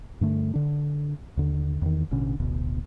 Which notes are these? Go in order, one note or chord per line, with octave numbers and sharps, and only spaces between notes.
G2 D3 A3
D3 D4
D#2 D3
E2 D#3
A1 B2 D3 C#4
D1 A1 D2 B2